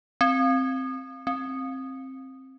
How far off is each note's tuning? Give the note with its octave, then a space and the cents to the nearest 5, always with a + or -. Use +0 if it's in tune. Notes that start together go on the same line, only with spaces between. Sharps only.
C4 +5
C4 +20